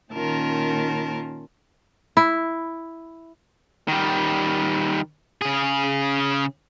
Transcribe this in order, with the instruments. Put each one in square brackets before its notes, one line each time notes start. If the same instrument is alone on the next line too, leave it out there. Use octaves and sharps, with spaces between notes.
[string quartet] A#2 D#3 C#4 F4 A#4 A5
[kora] E4
[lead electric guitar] D#3 G3
C#3 G#4